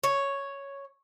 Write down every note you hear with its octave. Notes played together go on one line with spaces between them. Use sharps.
C#5